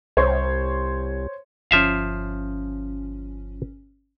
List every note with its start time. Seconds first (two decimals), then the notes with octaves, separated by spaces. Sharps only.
0.17 C2 C5 C#5 C6
1.71 G1 F3 C#4 E5 F5